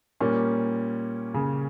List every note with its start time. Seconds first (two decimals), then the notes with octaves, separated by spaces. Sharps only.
0.20 A#2 G3 A#3 C#4
1.34 C#3